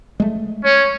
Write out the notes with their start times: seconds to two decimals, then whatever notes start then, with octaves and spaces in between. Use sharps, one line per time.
0.20 G#3 A3
0.64 C#4 C#5